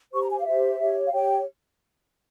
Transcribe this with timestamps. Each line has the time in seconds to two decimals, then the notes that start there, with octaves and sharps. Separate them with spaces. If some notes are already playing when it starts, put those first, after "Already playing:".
0.13 G4 C5 C#6
0.21 A#5
0.29 G#5
0.38 F5
0.46 G4 C5 E5
0.80 G4 C#5
1.06 F5
1.13 G4 C#5 G5